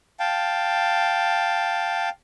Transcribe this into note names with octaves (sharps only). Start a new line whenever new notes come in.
F5 G5 A5